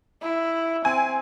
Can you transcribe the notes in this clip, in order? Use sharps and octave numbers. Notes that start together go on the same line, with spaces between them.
E4
C4 G#5